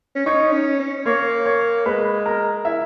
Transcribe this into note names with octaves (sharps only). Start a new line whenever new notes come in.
C#4
D#4 C#5 C#6
C#4
C#4
A#3 C#5 C#6
C#5 C#6
G#3 B4 B5
A#4 A#5
E4 E5